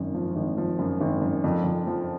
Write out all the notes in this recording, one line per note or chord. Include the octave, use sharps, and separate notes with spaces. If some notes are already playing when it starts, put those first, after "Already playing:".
Already playing: G#1 F#2
F3
G#1
F3
F#2
G#1
F#2
F2
F2
F3